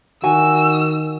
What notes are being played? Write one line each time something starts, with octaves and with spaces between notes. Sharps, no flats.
D#3 F#4 G#5 E6